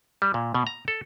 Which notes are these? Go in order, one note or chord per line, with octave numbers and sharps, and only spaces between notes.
G3
A#2
B2
A#5
A4